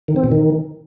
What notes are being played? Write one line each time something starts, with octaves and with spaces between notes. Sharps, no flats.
D#3
C4
B2
D#3